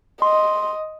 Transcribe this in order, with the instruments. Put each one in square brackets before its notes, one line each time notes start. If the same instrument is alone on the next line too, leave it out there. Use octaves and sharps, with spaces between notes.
[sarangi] D#5 [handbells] C6